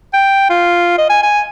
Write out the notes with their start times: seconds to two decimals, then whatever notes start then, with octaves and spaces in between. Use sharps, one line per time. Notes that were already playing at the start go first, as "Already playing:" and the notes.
0.14 G5
0.50 F4
0.98 D#5
1.09 G#5
1.23 G#5